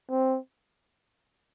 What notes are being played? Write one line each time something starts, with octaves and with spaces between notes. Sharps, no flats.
C4